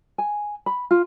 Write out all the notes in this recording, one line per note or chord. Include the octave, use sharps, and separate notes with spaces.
G#5
B5
F4